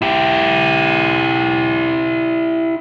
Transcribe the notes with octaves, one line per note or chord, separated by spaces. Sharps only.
E4 G4